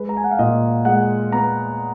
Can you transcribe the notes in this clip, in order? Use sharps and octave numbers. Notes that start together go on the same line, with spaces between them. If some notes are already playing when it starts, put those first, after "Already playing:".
Already playing: G#3 B4
A#5
G#5
F#5
F5
A#2 D#5
G#3 F#5
B3 A#5